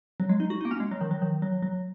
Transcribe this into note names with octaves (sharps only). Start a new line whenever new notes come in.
F#3
G#3
D#4
F#4
D#4
A#3
C#4
G#3
F#3
D#3
F#3
D#3
F#3
F#3